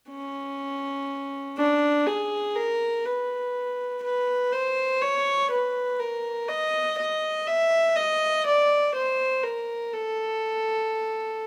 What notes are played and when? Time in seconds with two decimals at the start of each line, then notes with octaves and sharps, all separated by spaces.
0.10 C#4
1.58 D4
2.06 G#4
2.56 A#4
3.05 B4
4.03 B4
4.52 C5
5.02 C#5
5.50 B4
5.99 A#4
6.48 D#5
6.98 D#5
7.47 E5
7.96 D#5
8.46 D5
8.94 C5
9.43 A#4
9.93 A4